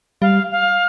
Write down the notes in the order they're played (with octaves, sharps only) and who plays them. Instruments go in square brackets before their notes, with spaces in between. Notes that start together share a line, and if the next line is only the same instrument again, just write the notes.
[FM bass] G3 [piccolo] F5
[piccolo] F5